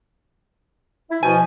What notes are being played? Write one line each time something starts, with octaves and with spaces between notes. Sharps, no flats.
E4
B2 F3 G#5